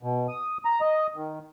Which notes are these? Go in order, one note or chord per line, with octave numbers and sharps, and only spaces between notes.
B2
D#6
A#5
D#5
D#3